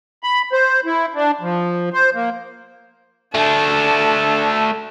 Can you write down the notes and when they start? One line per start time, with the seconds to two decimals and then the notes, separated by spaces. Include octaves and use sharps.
0.23 B5
0.53 C5
0.86 E4
1.15 D4
1.41 F3
1.93 C5
2.15 A#3
3.35 A3 D4 A5